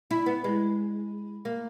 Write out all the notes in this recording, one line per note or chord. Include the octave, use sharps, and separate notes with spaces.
E4
B3
G#3
A#3